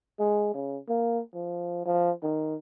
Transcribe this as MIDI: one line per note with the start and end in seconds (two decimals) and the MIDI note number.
0.19 0.51 56
0.55 0.78 49
0.89 1.21 58
1.34 1.83 53
1.86 2.11 53
2.23 2.55 51